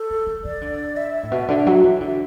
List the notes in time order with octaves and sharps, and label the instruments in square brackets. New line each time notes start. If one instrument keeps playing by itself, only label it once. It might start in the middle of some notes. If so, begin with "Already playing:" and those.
Already playing: [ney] A4
[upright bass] E3
E3
[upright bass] E3 [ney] D5
[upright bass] D3
[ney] E5
[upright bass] A2
B2
D3
F#3
E3
[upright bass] D3 [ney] E5